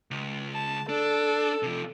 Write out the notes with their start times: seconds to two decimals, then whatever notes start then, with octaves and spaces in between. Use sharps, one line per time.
0.11 C#2
0.53 A5
0.89 D4 A4
1.62 C3 F3